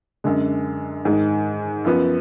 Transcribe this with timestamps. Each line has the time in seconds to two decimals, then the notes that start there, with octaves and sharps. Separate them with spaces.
0.24 F#2 D3 G#3
1.05 G#2 D#3 G#3
1.84 F#2 F3 B3